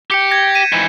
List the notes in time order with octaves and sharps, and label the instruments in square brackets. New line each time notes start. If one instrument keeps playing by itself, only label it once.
[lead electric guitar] G4 G5 [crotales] G6 C#7
[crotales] G6 G#6 A#6
B6 D#7 E7
[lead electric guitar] G#2 E3 [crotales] G#6